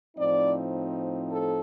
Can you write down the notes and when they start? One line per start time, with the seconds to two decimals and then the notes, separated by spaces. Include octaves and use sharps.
0.16 A2 F3 C4 D#4 D5
1.30 A4